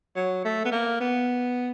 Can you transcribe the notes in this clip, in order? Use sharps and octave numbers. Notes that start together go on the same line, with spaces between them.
F#3
A3
B3
A#3
B3